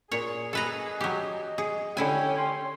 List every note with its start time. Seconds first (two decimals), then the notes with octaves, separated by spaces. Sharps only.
0.11 A#2 G#4 C#5
0.53 A4 B4 D#5 A#5
1.01 F#3 G4
1.58 G#4
1.97 D3 C#4 E4 G4 G5 G#5
2.38 C6